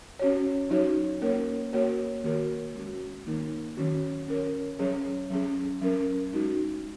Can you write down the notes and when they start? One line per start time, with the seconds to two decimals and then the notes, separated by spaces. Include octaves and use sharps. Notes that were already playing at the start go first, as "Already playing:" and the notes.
0.19 C#4 F#4 C#5
0.70 F#3 D#4 F#4 C#5
1.21 A#3 C#4 A#4 C#5
1.73 A#3 F#4 A#4 C#5
2.24 D#3 A#3 F#4 A#4 C#5
2.75 G#3 C#4 F#4
3.27 D#3 A#3 D#4 A#4
3.77 D#3 F#3 C#4 F#4
4.28 C#4 A#4 C#5
4.79 F#3 C#4 G#4 C#5
5.30 F#3 C#4 G#4
5.82 F#3 C#4 A#4
6.33 G#3 D#4 F#4